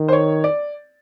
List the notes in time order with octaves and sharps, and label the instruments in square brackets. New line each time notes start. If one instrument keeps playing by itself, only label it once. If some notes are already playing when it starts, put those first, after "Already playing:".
Already playing: [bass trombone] D#3
[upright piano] C5
C#5
D5